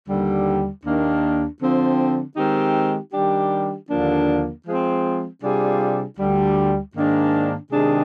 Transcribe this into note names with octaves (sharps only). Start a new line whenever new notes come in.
D#2 D3 G3
D#2 D#3 A#3 D4
D3 F3 C4
D#3 G#3 C4 D#4 G4
D#3 G3 D4 G4
D#2 D3 F3 A#3 D4
F3 G#3 C4
C3 G3 D4 F4 G#4
D2 D3 G3
G#2 D#3 A#3 D4
C3 D#3 G#3 D4 G#4